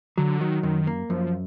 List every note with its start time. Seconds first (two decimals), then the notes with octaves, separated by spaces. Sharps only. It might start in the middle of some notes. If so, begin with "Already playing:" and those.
0.18 D3 F#3
0.41 D#3 F#3
0.63 F#2 D#3
0.87 A#3
1.09 F#2 F3